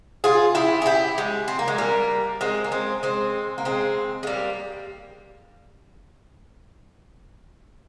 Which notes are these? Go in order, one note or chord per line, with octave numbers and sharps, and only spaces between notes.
F4 G#4
E4 G4
G#4
E4 G4
G#3
C4
A#3
G#3
G3 A#3
G#3 C4
A#3
G#3 C4
G#3 C4
A#3
G#3 C4
G#3
G3 A#3